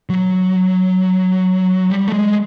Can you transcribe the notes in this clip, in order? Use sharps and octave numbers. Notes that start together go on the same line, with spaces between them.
F#3
G3
A3
G#3